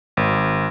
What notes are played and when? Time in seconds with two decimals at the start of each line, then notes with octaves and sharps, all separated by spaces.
0.17 G#1